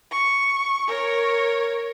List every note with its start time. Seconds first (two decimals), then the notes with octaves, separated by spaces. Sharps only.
0.11 C#6
0.88 A#4 C#5